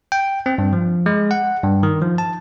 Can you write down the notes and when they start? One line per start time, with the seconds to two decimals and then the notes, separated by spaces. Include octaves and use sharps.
0.12 G5
0.46 C4
0.58 G2
0.73 F3
1.06 G#3
1.31 F#5
1.64 G2
1.83 D#3
2.02 F3
2.18 A5